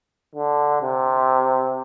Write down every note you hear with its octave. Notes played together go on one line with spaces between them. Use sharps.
D3
C3